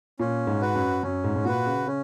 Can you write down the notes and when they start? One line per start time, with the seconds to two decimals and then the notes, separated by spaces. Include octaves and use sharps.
0.19 A#2 C#4
0.47 G#2
0.61 F#4 B4
0.75 F#2
1.03 F#2 C#4
1.24 G#2
1.36 G#2
1.45 A#2 F#4 B4
1.66 C#3
1.87 C#3 C#4